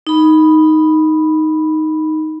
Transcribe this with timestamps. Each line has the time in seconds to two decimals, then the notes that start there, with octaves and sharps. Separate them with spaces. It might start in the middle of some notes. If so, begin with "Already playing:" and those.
0.07 D#4 B5